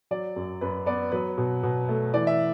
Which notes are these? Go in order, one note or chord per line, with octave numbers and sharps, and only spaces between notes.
F#3 D5
F#2
F#2 B4
B3 D5
F#3 B4
B2
B2
A3
E3 D5
E5